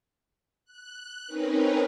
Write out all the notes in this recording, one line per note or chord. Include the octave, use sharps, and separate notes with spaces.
F#6
C4 C#4 D#4 A#4 B4